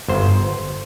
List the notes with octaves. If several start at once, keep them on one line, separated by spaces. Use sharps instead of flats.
G1 C5